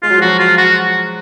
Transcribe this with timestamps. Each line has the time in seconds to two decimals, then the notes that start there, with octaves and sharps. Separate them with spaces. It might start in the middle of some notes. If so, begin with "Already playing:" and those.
0.03 G#3 F4
0.10 F#3
0.17 F3
0.21 F#3 F#4
0.39 F4
0.58 F#4